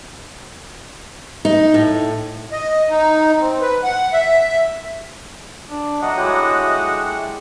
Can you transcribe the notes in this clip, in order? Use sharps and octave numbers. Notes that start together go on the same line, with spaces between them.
D#4
A2
D#5
D#4
C4
B4
F#5
E5
D4
F#3 A3 D4 D#5 F#5
G#3 E4 F#4 G4